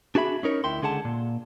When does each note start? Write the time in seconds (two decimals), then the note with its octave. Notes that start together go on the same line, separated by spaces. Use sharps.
0.15 D4 F#4 G#4 E5 B5
0.43 C#4 D#4 A#4 C#5
0.64 D2 E4 G5 C6
0.82 C#2 D3 G#4 F#5 A5
1.05 A#2